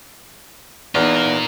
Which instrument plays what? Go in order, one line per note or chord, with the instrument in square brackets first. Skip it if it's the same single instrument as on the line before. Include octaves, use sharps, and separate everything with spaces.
[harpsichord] E2 [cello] B3 D#4 [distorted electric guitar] F4 A#4